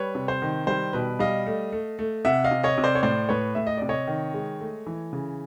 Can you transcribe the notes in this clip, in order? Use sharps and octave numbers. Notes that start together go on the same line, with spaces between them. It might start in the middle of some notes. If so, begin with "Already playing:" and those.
Already playing: G3 B4 C#5
C3
C5
D#3
G3 C5
B2 B4
G3 D#5 F5
A3
A3
A3
C3 E5 F#5
D#5 F5
C3
C#5 D#5
C3
C5 D5
C#5
A2 C5 D5
A2 B4 C#5
A2 E5
D#5
C3 D5
C#5 D#5
D#3
G#3
A3
E3
C#3